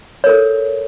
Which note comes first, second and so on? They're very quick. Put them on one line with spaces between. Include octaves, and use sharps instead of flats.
C#5 A#4 A4